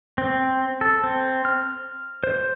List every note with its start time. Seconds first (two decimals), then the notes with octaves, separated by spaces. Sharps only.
0.18 C4
0.81 A4
1.04 C4
1.45 F6
2.24 C5